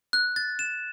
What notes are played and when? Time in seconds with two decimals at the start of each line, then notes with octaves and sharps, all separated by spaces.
0.13 F#6
0.36 A6
0.59 E7